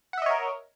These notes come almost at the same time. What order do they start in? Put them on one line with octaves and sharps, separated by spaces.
F#5 E5 D#5 C#5 A#4